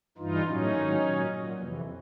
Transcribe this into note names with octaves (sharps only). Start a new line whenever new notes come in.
G2 E3 D#4 F4
A2 F#3 C#4 D#4
G#2 D#3 F#3
A#2 F#3
A#2 F#3
F2 C3 E3